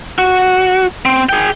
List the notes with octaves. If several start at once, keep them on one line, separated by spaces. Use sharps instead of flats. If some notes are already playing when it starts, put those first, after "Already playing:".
F#4
C4
G#4 G5